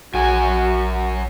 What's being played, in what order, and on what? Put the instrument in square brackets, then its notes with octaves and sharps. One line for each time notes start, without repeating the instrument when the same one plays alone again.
[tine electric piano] A#1 [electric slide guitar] F#2 G#5 [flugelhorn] F#4